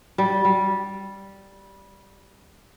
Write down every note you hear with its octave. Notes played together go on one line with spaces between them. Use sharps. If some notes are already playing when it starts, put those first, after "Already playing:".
G3
G3